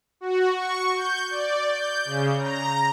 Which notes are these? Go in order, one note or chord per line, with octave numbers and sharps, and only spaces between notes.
F#4
C#6
G6
D5
G6
C#3
A#5